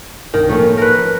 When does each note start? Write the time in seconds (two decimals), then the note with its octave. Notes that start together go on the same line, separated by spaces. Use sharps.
0.34 C2 G2 D#3
0.49 A2 F3 A3 A#3 C#4
0.77 A#4 B4